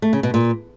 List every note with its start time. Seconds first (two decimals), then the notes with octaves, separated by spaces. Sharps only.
0.02 A3
0.13 C#3
0.23 B2
0.34 A#2